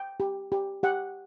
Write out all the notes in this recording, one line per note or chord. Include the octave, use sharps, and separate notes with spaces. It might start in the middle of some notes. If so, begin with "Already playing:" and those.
Already playing: G5
G4
G4
G4 F#5